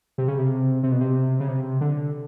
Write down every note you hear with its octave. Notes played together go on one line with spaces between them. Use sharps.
C3
C#3
C3
C3
B2
C3
C#3
C3
D3